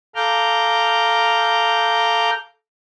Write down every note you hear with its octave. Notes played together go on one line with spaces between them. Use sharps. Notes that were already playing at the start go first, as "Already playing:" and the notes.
A4 F5 A#5 D6 F6 G6